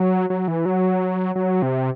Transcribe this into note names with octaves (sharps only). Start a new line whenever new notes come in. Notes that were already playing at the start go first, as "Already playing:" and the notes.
Already playing: F#3
F#3
E3
F#3
F#3
C3